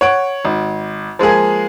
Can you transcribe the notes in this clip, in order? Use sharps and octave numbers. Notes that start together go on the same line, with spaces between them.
C#5 F#5 D7
G#1
F3 G#3 A#3 G#4